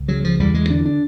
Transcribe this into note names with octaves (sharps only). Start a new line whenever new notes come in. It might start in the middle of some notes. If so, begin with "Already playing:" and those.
Already playing: C#2
C#3 F#3
F3
E2 G3
G#3
D3 D4
D4